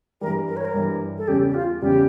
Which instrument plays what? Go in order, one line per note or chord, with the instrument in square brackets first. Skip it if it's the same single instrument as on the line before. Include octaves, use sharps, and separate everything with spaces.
[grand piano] G2 E3 G3 [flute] A#4
[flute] A#4
C#5
A#4
[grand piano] G2 E3 G3
[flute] A4
[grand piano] E2 C#3 G3 C#4 [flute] G4
[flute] G4
F4
[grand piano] E2 C#3 G3 C#4 [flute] G4